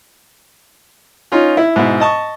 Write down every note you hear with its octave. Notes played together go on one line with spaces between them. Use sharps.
C#4 D#4 F4
E4
G#2 B2 E4
D#5 A5 C#6